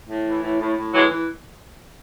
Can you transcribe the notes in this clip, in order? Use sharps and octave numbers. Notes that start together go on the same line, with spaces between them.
A2
E3
A2
A2
A2
E3 F#3 G#3
E3